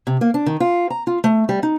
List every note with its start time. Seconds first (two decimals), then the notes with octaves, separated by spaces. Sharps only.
0.07 C3
0.21 A#3
0.34 D4
0.46 D#3
0.60 F4
0.90 A#5
1.07 F4
1.24 A3
1.49 G3
1.63 D#4